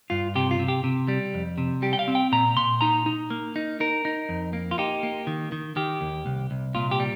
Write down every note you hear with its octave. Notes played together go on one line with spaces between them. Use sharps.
G2 F4
C3 G4
F4
C3
G4
C3
G3
F2
C3
G3 G4
G5
F5
C4
G5
A#2 A#5
A#2 C6
D#4 A#5
D#4
A#3
D#4
D#4 A#4
D#4
F2
A#3
F4
D#4 G4
A#3
D#3
D#3
D#3 G4
D#2
C2
C2
A#2 F4
G4
G3